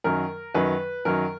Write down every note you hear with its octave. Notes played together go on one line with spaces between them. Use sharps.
F#2 D#3 F#3 A#4
F#2 D#3 F#3 B4
F#2 D#3 F#3 A#4